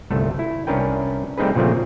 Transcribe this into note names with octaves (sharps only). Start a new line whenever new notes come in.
G1 C2 A3 A4
E4
C2 C#4 D4 A#4 B4 G5
G3 A3 C4 D#4 G#4 B4
A#2 C#3 F3 A3 C4